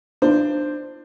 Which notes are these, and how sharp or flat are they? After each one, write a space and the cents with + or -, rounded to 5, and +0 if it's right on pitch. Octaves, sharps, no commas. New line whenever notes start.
D4 +20 F4 -40 C5 +0